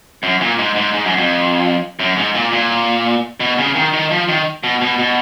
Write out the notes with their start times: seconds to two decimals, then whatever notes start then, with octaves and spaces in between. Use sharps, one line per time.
0.23 F#2
0.41 A#2
0.58 G#2
0.76 G#2
0.94 G#2
1.05 F#2
1.18 F2
1.99 F#2
2.17 G#2
2.35 A#2
2.52 A#2
3.40 B2
3.58 C#3
3.75 D#3
3.93 D#3
4.11 F3
4.28 D#3
4.64 B2
4.82 B2
4.99 B2